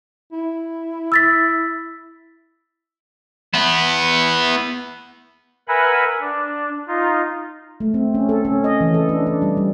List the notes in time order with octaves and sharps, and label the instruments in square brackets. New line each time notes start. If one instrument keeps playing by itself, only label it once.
[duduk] E4
[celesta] E6 A6 B6
[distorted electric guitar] B3 E4
[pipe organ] A#4 B4 E5 F#5 G#5 B5
D4
D#4 F4
[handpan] A3
C4
C#4
A4
C#4
D#5
E3
A4
D4
D4
G3
G3